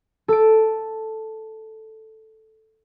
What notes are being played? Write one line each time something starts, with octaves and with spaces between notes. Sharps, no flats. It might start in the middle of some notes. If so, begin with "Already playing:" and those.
A4 D7